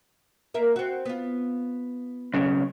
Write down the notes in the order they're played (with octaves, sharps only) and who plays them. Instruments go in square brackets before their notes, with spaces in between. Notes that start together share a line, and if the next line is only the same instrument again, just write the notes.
[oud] A#3 A#4 E5
C4 F#4
B3 F4
[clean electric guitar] B1 C#3